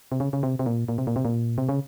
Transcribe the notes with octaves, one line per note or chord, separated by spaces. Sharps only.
C3
C#3
C#3
C3
C3
A#2
A#2
C3
A#2
C3
A#2
C3
C#3